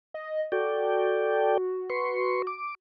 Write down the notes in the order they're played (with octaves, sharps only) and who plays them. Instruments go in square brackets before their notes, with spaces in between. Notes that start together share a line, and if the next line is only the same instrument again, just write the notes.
[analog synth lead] D#5
[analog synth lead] F#4 [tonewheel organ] A4 D5 G5
[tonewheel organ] B4 C6 C#6
D6